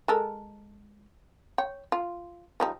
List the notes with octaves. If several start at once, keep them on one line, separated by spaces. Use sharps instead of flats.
G#3 A4 A#4
C#5 G5
F4
F3 G3 D#4